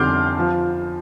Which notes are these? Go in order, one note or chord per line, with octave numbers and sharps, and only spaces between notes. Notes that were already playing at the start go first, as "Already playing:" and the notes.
Already playing: F2 D3 G3 C6 D6 F6 G6
F3